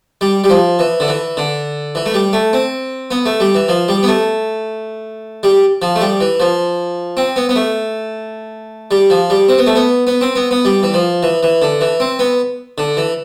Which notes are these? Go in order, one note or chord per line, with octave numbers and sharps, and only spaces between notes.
G3
G3
F3
E3
D3
E3
D3
E3
A3
G3
A3
C4
B3
A3
G3
E3
F3
G3
B3
A3
G3
F3
A3
G3
E3
F3
C4
B3
B3
A3
G3
F3
G3
C4
B3
A3
B3
B3
C4
B3
B3
G3
E3
F3
E3
E3
D3
E3
C4
B3
D3
E3